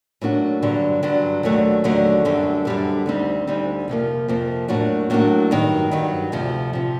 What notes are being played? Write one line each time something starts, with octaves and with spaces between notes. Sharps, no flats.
A2 F#3 A#3 D4 F#4
G2 D3 F#3
G2 D3 F#3
D#2 D3 F#3 A3
D#2 D3 F#3 A3
F#2 D3 G3 C4
F#2 D3 G3 C4
D2 D3 G3 C4 D#4
D2 D3 G3 C4 D#4
F2 C3 F3 A#3
F2 C3 F3 A#3
A2 F#3 A#3 D4 F#4
A2 F#3 A#3 D4 F#4
G2 D#3 F#3
G2 D#3 F#3
D2 C3 F3
C3 F3